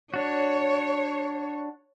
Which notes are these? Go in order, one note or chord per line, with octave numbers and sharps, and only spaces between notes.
D4 F#4 C#5